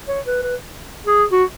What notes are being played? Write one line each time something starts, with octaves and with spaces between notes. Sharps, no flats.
C#5
B4
B4
G#4
F#4